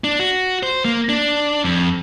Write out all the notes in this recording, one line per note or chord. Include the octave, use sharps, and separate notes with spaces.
D4
F#4
C5
A#3
D4
F2